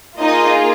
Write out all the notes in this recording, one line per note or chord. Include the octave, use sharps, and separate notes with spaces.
A#3 D#4 F4 G#4 D#5